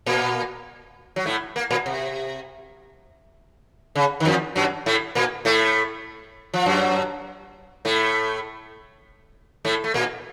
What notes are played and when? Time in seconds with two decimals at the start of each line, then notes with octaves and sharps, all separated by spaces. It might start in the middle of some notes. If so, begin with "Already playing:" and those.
0.06 A#2 A#3
1.16 F#3
1.26 A2 A3
1.56 A#3
1.71 A#2 A#3
1.86 C3
3.95 C#3
4.20 D#3
4.25 F2 F3
4.55 F#2 F#3
4.86 A2 A3
5.15 A#2 A#3
5.45 A2 A3
6.54 F3
6.66 F#2 F#3
7.85 A2 A3
9.65 A2 A3
9.84 A3
9.94 A#2 A#3